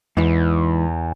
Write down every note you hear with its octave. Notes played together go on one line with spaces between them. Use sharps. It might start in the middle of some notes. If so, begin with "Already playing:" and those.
E2 G#2 E3